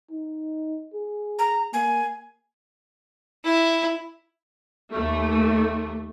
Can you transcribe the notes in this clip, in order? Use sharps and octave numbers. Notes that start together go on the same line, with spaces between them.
D#4
G#4
A#5
A#3 G#5
E4
D#2 A3